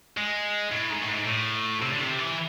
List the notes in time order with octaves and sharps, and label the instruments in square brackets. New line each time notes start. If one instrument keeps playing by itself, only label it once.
[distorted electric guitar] G#3
A2
G#2
A2
G#2
A2
C3
D3
C3
E3